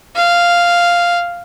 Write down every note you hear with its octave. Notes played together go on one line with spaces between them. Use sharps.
F5